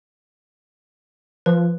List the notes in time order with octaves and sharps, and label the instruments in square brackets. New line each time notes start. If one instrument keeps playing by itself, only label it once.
[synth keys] F3 [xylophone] B4